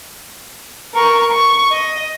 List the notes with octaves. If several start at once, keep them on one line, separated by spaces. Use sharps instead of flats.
A#4 C#6
C#6
D#5